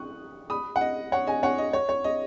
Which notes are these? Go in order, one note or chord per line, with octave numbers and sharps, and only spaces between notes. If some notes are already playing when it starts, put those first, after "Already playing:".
Already playing: C#6 D#6 F#6
B5 D#6
F#5
D#5
C#5 F#5
D#5 G#5
C#5 F#5
D#5
C#5
C#5
D#5